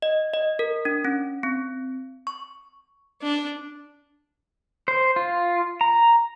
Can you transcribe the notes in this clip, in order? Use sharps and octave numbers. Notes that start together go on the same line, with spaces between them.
D#5
D#5
A#4
D4
C#4
C4
C#6
D4
C5
F4
A#5